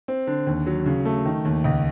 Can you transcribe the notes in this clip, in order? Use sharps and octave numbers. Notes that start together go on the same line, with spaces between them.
C4
D3
D#2
F#3
C#3
A3
D#3
D#2
C#2